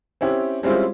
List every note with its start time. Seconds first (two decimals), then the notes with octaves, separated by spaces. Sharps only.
0.21 C4 C#4 E4 G4
0.63 G3 G#3 C4 C#4 E4 F4